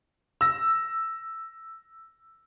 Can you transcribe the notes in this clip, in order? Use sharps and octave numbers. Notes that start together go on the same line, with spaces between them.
E6 A#6